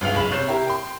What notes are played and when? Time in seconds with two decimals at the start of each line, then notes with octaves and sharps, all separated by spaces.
0.01 G1 C#2 F5 F7
0.14 F#1 B1 G#4 B5 F#7
0.31 C3 C#5 G6 C7 E7
0.47 E4 G4 A#4
0.67 G5 C6